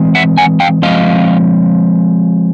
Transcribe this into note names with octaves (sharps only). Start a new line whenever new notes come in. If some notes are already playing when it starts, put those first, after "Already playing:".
Already playing: E3 G#3 C4
E5 F#5
F#5 G#5
F5 G5
F3 G#3 C4 D#5 F5